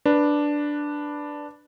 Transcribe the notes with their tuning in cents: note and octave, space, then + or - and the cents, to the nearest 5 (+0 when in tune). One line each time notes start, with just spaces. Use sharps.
D4 +0 B4 -5